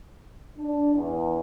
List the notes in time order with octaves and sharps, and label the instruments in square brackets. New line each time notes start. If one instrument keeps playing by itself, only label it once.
[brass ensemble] D4
E2